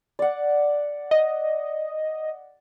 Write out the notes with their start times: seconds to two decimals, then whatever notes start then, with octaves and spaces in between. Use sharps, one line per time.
0.19 D5 F#5
1.11 D#5